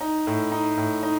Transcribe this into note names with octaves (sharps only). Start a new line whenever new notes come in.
D#4
A2
D#4
A2
D#4